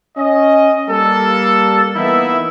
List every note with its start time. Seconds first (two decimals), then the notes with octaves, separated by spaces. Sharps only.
0.17 C#4 D#5
0.89 G3 A#3 A4
1.95 E3 A#3 B3 D#4 E4 E5